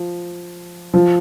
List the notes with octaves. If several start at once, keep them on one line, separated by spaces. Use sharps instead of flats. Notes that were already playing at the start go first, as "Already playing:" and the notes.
Already playing: F3
F3